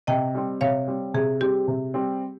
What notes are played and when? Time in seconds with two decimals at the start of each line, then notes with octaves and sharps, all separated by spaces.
0.07 C3 D#5 G5
0.35 G3 C4
0.61 C3 C#5 F5
0.88 G3 C4
1.14 C3 G#4
1.41 G3 C4 G4
1.68 C3
1.94 G3 C4